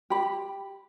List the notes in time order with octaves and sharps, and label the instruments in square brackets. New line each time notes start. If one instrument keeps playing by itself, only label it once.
[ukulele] G4 B5